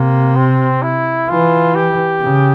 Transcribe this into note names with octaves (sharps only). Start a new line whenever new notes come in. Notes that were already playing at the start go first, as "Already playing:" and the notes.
Already playing: C3 A#3
C4
E4
E3 F4
G4
C#3